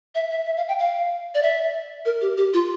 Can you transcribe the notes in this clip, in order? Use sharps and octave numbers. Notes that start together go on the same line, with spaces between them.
E5
E5
E5
F5
G5
F5
D5
E5
A#4
G4
G4
F4